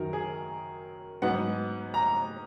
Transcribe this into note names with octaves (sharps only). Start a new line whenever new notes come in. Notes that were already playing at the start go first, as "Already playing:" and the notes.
Already playing: F#2 D#3 F#3 A#4
G#4
G#2 F#3 B3 D#4 F#5
A#5